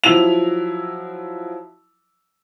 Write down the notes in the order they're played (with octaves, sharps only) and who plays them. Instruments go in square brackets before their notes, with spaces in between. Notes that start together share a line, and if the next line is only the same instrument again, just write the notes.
[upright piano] F3 F#3 E4 F7